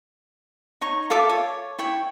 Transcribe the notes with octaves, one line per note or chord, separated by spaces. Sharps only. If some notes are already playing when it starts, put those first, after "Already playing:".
D#4 C#5 A#5 C#6
F4 A4 E5 D6
C#5
E4 C#5 G5